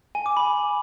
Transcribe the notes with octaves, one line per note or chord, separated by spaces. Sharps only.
G#5
D6
B5